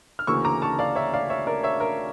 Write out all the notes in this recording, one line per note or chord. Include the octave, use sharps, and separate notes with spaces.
F6
D2 C#3 E3 A#3 C#6 E6
A#5 D6
A5 C#6
D5 F5
C#5 E5
D5 F5
C#5 E5
A#4 D5
C#5 E5
A#4